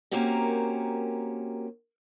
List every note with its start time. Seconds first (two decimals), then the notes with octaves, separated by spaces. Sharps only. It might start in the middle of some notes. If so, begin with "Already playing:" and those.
0.11 A#3 C4 C#4 F#4 G4 A#4